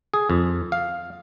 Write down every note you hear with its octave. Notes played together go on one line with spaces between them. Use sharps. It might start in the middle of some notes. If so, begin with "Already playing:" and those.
G#4
F2
F5